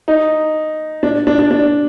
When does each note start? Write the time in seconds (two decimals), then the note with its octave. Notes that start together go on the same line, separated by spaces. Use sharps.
0.08 D#4
1.03 D4
1.27 D4
1.39 D4
1.51 D4